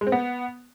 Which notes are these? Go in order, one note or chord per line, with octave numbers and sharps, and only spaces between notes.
G#3
C4
B3